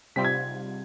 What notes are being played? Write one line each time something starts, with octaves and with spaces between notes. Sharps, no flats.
C3 G3 C4 F4 B6
G#6